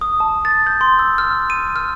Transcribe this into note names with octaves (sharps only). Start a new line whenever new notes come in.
D#6
A5
A6
G6
C6
E6
F6
D#7
F6